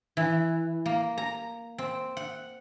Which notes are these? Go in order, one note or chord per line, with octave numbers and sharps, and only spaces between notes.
E3
A#3
A#5
C4
F#5